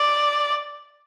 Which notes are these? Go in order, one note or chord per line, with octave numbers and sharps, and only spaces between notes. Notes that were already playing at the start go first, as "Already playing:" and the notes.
Already playing: D5